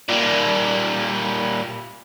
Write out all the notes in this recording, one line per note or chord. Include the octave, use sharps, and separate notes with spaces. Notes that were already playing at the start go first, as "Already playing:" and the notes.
A#2 G3